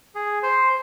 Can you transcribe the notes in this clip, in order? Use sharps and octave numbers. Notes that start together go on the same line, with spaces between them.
G#4
C5